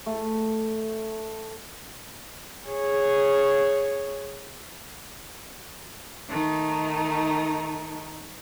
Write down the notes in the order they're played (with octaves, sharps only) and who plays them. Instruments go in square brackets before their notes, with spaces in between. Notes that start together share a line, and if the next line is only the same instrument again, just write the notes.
[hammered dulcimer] A3
[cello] G#4 C#5
[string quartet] D#3 A3 D#4